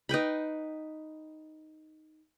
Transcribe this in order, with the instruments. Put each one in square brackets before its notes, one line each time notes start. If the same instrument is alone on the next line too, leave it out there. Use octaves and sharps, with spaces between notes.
[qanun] D#4 B4 G5 B5